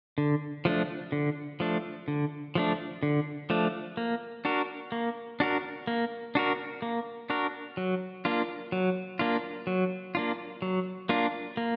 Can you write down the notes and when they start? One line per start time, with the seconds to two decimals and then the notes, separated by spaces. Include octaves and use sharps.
0.18 D3
0.65 F3 A3 D4
1.12 D3
1.60 F3 A3 D4
2.08 D3
2.55 F3 A3 D4
3.03 D3
3.50 F3 A3 D4
3.97 A#3
4.45 D4 F#4 A#4
4.92 A#3
5.40 D4 F#4 A#4
5.87 A#3
6.35 D4 F#4 A#4
6.82 A#3
7.30 D4 F#4 A#4
7.77 F#3
8.25 A#3 D4 F4
8.72 F#3
9.19 A#3 D4 F4
9.67 F#3
10.15 A#3 D4 F4
10.62 F#3
11.09 A#3 D4 F4
11.57 A#3